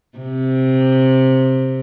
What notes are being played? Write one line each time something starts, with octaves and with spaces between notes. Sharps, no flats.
C3